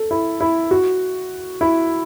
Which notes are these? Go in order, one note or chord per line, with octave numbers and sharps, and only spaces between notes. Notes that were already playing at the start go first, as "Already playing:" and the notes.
Already playing: A4
E4
E4
F#4
E4